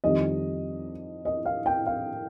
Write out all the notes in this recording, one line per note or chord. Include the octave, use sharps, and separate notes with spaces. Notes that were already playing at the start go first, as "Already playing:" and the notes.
F2 D#3 G3 D#5
D#5
F5
G5
F5